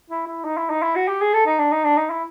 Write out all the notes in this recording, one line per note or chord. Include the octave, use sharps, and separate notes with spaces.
E4
E4
D#4
E4
D#4
E4
F#4
G4
G#4
A4
D#4
D4
D#4
D4
D#4
E4